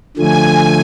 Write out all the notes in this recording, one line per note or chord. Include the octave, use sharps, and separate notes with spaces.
D3 F3 A3 G#5